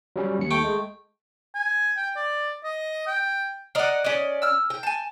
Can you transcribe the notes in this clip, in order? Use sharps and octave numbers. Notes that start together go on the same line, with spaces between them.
F#3 G3 C#4
D#2 C#7
A3 G5
G#3
G#5
G5
D5
D#5
G5
A#4 D5 D#5 F#5
C#4 D5 D#5
E6 F6
G5
G#5 A5